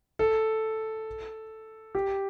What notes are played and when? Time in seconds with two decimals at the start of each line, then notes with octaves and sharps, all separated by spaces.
0.19 A4
1.95 G4